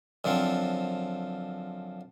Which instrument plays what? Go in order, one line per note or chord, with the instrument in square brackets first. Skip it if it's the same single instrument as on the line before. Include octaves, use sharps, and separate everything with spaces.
[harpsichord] F#2 D3 F3 C4